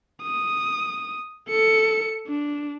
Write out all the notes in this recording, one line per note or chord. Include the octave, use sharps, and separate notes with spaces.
D#6
A4 C#7
D4